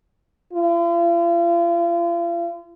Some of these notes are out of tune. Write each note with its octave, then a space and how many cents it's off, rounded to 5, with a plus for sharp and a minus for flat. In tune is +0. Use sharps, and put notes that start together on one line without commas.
F4 -40